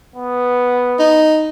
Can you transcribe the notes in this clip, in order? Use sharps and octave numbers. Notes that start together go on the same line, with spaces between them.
B3
D#4